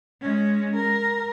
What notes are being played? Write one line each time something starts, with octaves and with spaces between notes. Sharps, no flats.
G#3 C#4
A#4